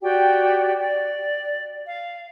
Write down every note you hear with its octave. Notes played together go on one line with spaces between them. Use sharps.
F#4 G4 D5 G5
D5
F5